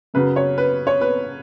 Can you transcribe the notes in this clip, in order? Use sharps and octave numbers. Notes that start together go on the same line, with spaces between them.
F#2 C#3 F#3 B4
C#5
B4
C#5
B4